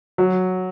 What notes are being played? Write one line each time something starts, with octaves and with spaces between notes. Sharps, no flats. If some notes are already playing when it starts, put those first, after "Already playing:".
F#3